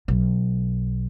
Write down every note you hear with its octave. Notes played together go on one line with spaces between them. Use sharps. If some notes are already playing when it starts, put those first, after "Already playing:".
B1